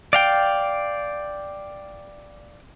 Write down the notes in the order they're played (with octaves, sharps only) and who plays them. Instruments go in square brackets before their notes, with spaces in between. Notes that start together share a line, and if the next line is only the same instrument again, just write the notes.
[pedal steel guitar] D5 F5 G5